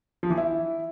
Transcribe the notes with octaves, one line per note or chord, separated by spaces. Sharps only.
F3
E3
E4